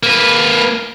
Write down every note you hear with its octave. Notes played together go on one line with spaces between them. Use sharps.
A#3 B4